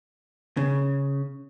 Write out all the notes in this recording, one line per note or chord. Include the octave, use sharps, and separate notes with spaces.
C#3